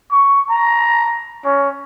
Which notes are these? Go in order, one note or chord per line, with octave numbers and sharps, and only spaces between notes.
C#6
A#5
C#4